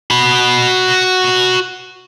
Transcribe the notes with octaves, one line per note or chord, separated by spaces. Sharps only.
F#4 B5